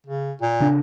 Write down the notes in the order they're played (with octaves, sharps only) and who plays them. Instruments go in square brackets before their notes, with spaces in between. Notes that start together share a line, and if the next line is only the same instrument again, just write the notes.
[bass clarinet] C#3
A#2
[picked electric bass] C#3 D4